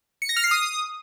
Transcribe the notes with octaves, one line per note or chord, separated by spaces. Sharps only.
C#7
A#6
F6
C7
D#6